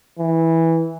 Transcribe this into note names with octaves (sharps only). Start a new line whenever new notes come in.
E3